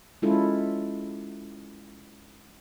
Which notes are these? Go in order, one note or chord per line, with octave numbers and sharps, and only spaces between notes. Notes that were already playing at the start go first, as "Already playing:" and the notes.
G#3 C#4 E4 F4 A4